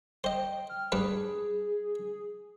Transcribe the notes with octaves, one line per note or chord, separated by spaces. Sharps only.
C5 D#5 G5
F6
G2 D4 G#4 B4